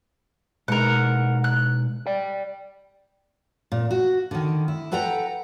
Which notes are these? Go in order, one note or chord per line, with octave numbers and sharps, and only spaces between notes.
B2 G#3 D#4 A#4 F#5
F#6
D5 G5
A#2
F#4
D3 D#3
E4
A4 B4 F#5 G5 A#5